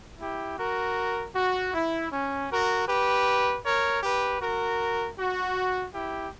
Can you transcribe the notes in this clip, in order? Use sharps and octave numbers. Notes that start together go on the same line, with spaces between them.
E4 G4
F#4 A#4
F#4
E4
C#4
F#4 A#4
G4 B4
A#4 C#5
G4 B4
F#4 A#4
F#4
E4 G4